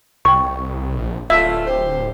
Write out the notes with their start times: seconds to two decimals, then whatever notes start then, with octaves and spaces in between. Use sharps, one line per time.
0.25 C2 G5 C#6
0.96 A#1
1.30 D1 A3 F4 E5
1.67 G4 C5